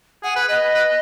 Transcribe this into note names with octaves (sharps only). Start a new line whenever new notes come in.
G#4 F#5
B4
B4 D#5
B4